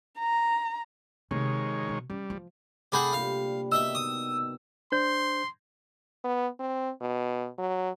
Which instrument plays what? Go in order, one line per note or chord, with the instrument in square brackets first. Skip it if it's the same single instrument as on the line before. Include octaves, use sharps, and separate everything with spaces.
[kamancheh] A#5
[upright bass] C3 [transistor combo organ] D#3 G#3 C#5
[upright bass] B2
[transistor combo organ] G3 [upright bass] C#4
[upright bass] F3
[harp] C3 B5 G6 [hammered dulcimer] A3 [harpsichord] D4 G#4 F#5
[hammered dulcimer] A#2 D3 G3 [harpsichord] F5
[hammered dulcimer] B2 D#3 [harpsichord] D#5 E5 [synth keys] E6
[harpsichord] D#6
[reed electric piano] D4 C5 G6 [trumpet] C6
[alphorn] B3
C4
B2
F#3